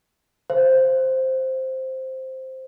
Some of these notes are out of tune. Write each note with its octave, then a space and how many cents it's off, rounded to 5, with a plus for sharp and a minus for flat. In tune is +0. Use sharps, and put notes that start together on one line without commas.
C5 +0 F5 -35